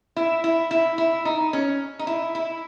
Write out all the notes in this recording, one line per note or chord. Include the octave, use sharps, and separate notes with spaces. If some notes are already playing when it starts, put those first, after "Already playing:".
E4
E4
E4
E4
D#4
C#4
D#4
E4
E4